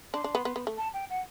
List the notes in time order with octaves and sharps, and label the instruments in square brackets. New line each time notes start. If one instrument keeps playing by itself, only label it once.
[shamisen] D4 [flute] C6
[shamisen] D4
B3
B3
B3
A3
[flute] A5
G5
F#5